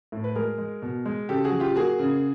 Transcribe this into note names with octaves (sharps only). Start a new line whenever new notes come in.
A2
B4
G#3 G#4 A#4
G#3
B2
G#3
C#3 G4 A4
F#4 G#4
F#3
F4 G4
A#3 F#4 G#4
C#3